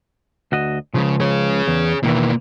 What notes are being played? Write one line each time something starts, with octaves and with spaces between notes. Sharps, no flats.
D2 F#4 D#5
C#2 G#2 C#3 F3
G#4 C#5
E2
E2 B2 D#3 E3 A#3